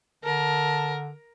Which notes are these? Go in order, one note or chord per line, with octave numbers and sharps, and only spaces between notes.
D3 A#4 A5